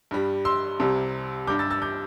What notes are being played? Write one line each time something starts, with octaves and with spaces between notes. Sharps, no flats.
G2 G3
C6 E6
C2 C3 G3
G2 G3 D6 G6
E6 A6
E6 A6
D6 G6